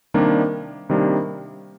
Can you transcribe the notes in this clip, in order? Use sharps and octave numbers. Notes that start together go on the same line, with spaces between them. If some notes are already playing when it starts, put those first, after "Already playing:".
C3 D#3 G3 A#3 D4
C3 D#3 G3 A#3 D4